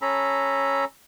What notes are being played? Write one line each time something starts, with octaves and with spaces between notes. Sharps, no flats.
C#4 A4 A#5 B5